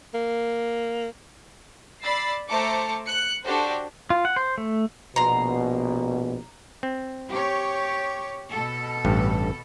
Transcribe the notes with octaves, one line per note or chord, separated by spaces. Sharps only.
A#3
D5 B5 E6 A6 C7
A3 C5 A5 A#5 D6 C#7
F#6 C#7
D4 F#4 G4 A4 C5
F4
F#5
C5
A3
A#1 B2 A#5 C6
C4
G4 C#5
B2 A4
A1 G2